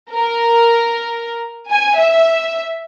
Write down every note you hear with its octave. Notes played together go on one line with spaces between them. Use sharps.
A#4
G#5
E5